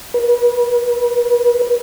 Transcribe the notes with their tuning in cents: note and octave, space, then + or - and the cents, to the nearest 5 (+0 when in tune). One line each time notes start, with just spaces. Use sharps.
B4 -40